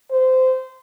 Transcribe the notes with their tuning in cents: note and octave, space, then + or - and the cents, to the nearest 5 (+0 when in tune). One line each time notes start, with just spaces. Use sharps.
C5 -20